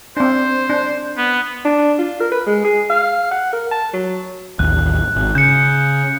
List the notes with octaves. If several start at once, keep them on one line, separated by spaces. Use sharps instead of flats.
C4 D4 C5
D4
B3
D4
F4
A#4
B4
G#3
G#4
F5
F#5
A#4
A5
F#3
A1 D#2 F#6
G#1
C#3 G6 C#7